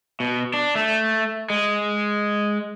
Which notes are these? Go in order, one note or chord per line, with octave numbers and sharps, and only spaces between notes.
B2
D4
A3
G#3